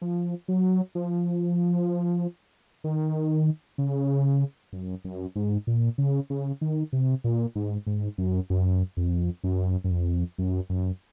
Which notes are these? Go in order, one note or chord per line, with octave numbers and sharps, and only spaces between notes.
F3
F#3
F3
D#3
C#3
F#2
F#2
G#2
A#2
C#3
C#3
D#3
C3
A#2
G#2
G#2
F#2
F#2
F2
F#2
F#2
F2
F#2
F#2